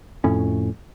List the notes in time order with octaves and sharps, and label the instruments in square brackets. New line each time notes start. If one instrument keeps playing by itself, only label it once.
[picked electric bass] F2 A2 C#4